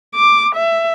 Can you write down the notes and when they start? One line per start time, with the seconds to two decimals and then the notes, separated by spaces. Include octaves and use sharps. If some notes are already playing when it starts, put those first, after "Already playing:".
0.15 D6
0.55 E5